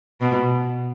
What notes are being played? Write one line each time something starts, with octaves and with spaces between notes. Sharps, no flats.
B2